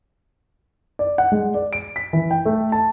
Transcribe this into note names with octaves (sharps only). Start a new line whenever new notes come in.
D5
F#5
G#3
D5
D7
B6
E3
G5
A3
A5